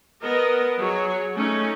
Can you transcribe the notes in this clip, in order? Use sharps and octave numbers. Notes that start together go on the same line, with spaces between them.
B3 A#4 D#5
F#3 G#4 C#5
A3 C#4 D#4